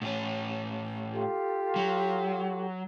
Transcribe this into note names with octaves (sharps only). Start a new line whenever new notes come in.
A2 C#4
F4 G4 A4
F#3